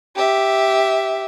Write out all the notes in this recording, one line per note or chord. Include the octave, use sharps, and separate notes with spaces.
G4 E5